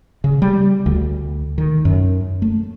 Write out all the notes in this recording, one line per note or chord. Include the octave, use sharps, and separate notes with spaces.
C#3
G3
D2
D#3
F#2
A3